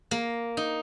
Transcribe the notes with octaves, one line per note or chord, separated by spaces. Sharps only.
A#3
D#4